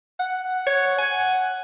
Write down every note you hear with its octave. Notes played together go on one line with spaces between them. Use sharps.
F#5
C#5
G#5